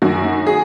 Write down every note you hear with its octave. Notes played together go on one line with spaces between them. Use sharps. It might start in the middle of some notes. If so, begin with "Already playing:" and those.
F#2 D#3 F#4
G#4